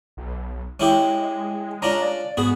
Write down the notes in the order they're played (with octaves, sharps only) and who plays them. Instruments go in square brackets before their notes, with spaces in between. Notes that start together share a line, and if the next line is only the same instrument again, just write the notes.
[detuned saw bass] B1
[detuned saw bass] G#3 [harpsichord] C#4 E4 G4
[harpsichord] C#4 D4 F4 [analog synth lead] A#5
[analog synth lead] D5
[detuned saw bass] G#2 [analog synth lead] B3 [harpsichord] F#4 G#4